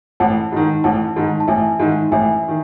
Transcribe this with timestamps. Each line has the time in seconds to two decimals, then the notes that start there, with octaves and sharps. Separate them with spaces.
0.20 A1 F#5 A5
0.52 G#2 D#3
0.84 A1 F#5 A5
1.16 G#2 D#3
1.40 A5
1.48 A1 E5 G#5
1.80 G#2 D#3
2.12 A1 E5 G#5
2.48 D#3